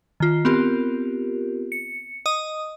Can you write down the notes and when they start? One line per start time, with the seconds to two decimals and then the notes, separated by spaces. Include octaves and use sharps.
0.20 D#3 F4
0.45 B3 C4 F4 G4 A#4
1.72 C#7
2.26 D#5 D#6